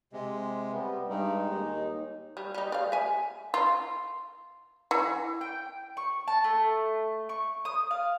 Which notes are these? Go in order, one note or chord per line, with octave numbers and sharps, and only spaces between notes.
C3 G#3
G3 B3
G2 G#3 D#4
D#2
G3
G3 D#4
D5 F5
E5 G#5
F4
E3
G5
C#6
A5
A3
C#6
D#6
F5